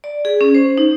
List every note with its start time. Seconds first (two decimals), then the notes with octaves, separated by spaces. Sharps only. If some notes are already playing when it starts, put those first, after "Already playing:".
0.04 D5
0.25 G#4
0.41 C#4
0.55 C5
0.78 D#4